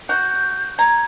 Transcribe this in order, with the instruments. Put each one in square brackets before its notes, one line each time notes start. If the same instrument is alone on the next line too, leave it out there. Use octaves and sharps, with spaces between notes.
[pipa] F#4 [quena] G6
[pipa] A#5 [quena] G#6